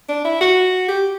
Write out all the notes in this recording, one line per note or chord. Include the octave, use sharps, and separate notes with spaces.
D4
E4
F#4
G4